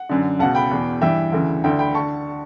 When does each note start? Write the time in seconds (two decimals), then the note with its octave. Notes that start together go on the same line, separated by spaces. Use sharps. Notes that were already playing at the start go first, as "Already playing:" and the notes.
Already playing: F#5
0.09 F#2 D3
0.39 C#2 B2 F#5 A5
0.55 G5 B5
0.71 E2 B2
1.01 G2 E3 E5 G5
1.32 D2 C#3 E3
1.64 D2 D3 E5 G5
1.79 G5 B5
1.95 D3 A5 C#6